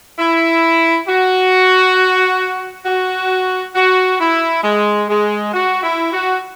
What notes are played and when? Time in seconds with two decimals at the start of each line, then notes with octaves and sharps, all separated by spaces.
0.19 E4
1.08 F#4
2.85 F#4
3.75 F#4
4.19 E4
4.64 G#3
5.09 G#3
5.53 F#4
5.82 E4
6.12 F#4